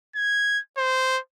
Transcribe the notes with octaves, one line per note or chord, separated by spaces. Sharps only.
G#6
C5